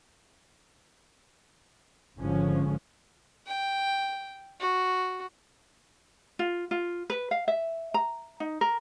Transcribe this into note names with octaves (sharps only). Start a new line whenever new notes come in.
G#1 D3 F3 G#3 C#4
G5
F#4
F4
F4
B4
F5
E5
A#5
D#4
A#4